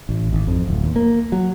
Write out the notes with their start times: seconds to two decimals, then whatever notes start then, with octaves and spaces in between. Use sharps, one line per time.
0.09 A1
0.33 G#1
0.47 F2
0.68 D1
0.84 D#2
0.96 A#3
1.32 F#3